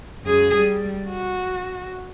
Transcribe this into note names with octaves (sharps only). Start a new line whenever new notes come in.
F#2 G#4
G3
F#4